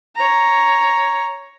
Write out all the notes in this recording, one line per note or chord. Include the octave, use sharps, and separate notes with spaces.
C#5 A#5